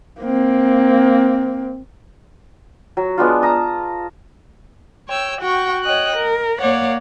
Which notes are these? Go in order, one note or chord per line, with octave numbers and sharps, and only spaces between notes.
A#3 C4
F#3
G#3 B3 D4 F4
A5 A#5 D#6
C#5 G5 E6
F#4 F#5 G5 C#6
C#5 D#5 G5 F#6
A#4
A#3 C#5 D5 F5 F#5